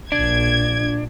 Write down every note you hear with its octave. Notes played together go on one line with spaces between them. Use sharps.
A#1 D4 G#6